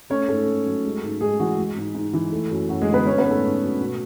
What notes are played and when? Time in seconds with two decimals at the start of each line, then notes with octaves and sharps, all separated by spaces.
0.10 A3 C#4 C#5
0.28 G#2 A3 A4
0.47 G#2
0.66 F#3
0.84 G#3
1.03 G#2
1.21 G#2 G#3 G#4
1.39 E3 F#4
1.58 G#3
1.77 G#2
1.95 G#2
2.13 E3
2.32 A3
2.51 F#2
2.69 F#2 F#4
2.81 G#3 G#4
2.88 D3
2.94 B3 B4
3.06 A3 C#4 C#5
3.18 B3 B4
3.25 G#2
3.30 A3 A4
3.43 G#2
3.62 F#3
3.80 B2